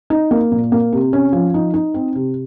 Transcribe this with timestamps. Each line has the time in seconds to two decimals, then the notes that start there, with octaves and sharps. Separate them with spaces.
0.10 D#4
0.31 A#3
0.52 A#2
0.72 A#3
0.93 C3
1.13 C#4
1.33 F3
1.54 D#4
1.74 D#4
1.94 C4
2.15 C3